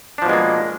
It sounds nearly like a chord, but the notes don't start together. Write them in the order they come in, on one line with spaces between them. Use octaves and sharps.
D4 F3 B2 G#3 A#3